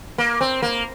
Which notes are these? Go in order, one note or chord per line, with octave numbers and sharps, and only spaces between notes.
A#3
C4
A#3